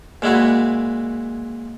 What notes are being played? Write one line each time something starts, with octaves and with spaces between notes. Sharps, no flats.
A#2 G#3 E4 F#4